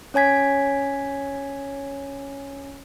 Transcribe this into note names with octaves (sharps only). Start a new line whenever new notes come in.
C#4 C#5 G#5 G#6 B6